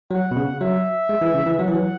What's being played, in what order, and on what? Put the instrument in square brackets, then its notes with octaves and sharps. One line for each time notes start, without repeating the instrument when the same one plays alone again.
[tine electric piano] F#3 [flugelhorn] F#5
[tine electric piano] B2
C#3
[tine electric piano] F#3 [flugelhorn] E5
[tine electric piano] G#3
E3
C#3
E3
[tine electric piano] F#3 [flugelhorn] F#5
[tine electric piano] E3
F#3